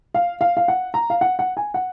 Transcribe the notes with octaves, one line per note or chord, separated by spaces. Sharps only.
F5
F5
F5
F#5
A#5
F5
F#5
F#5
G#5
F#5